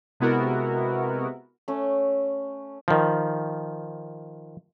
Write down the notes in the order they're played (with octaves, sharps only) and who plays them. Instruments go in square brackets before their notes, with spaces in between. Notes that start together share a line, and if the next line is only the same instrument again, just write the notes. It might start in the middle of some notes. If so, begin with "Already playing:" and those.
[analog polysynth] C3 G#3 B3 E4 F#4 A#4
[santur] A3 C#4
[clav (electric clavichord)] D#3 F3